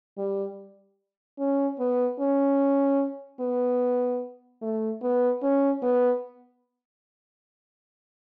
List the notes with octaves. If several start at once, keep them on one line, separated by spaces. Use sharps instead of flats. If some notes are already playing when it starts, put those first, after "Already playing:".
G3
C#4
B3
C#4
B3
A3
B3
C#4
B3